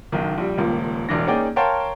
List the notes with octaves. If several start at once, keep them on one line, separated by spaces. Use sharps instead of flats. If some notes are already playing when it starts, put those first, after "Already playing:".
F#1 B1 D#3
A#1 G3
D#1 C#2 F3 A#3
E1 A1 D4 A#6
A#3 C#4 D#4 G#4 D5 G5
A#4 C#5 F5 G5 A5 C6